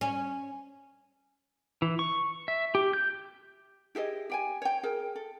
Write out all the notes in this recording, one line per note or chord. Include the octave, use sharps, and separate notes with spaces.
C#4
E3
C#6
E5
G4
G6
E4 G4 G#4 D#5
G4 G5 G#5
C#5 G5
G#4 A#4 G5
A4